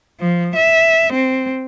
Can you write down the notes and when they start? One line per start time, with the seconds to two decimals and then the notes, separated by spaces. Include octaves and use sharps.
0.21 F3
0.56 E5
1.13 C4